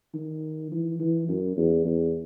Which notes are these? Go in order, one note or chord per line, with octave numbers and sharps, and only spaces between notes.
D#3
E3
E3
F#2
E2
E2